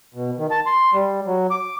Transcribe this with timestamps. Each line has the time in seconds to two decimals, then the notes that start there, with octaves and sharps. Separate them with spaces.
0.14 B2
0.38 D#3
0.51 A5
0.66 C6
0.93 G3
1.26 F#3
1.51 D6